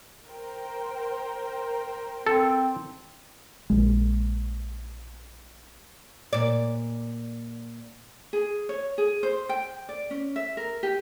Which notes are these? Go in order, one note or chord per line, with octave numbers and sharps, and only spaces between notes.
A#4 C5 G5
C4 A4
A#1 G#3
A#2 D5
G#4
C#5
G#4
C5
G5
D5
C#4
E5
A#4
G4